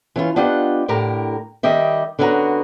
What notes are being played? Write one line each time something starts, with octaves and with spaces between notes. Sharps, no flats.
E3 C#4 F4
B3 D4 F4 G4 D#5 F#5
A2 D3 G4 A#4 A#5
D#3 G3 G4 D#5 E5
D3 B3 C#4 E4 F#4 A#5